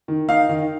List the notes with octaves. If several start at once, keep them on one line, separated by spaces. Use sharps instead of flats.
D#3
D#4 F5
D#3